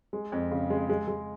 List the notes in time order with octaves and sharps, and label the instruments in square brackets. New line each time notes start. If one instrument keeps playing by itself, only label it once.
[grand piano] G#3
F2
C#3
G#3
G#3
G#3